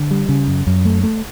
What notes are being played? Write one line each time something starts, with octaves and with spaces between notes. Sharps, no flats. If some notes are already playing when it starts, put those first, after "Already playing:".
Already playing: D3
G3
C#3
F#2
F#2
A3
A3